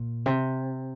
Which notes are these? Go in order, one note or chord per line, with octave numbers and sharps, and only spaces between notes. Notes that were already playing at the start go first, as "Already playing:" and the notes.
Already playing: A#2
C3